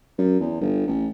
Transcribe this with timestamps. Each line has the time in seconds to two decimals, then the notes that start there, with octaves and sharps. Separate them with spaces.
0.18 F#2
0.40 E2
0.61 G1
0.87 A1